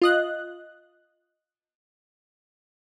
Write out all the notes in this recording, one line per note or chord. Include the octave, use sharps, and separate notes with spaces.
F4 D#5 F#6